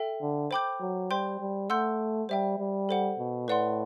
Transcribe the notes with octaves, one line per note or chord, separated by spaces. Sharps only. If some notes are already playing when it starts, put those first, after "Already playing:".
Already playing: A4 E5 G5
D3
C5 G5 B5 D6 G6
F#3
G3 C5 G5 C6 G6
G3
A3 F#5 C6 E6 G6
G3 C5 E5 G5
G3
A4 C5 F#5
B2
A2 B4 D5 F#5 C6